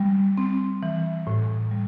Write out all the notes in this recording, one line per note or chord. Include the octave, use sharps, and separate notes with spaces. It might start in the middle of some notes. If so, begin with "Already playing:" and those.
Already playing: G3
C4
E3
A2
G3